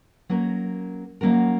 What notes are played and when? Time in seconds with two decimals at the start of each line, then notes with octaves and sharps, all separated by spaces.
0.29 F#3 A#3 C#4 F#4 A#4
1.21 F#3 A#3 C#4 F#4 A#4